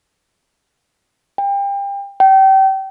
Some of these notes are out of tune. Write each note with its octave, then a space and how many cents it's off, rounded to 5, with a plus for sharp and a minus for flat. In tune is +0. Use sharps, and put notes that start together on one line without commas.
G5 +30
G5 -30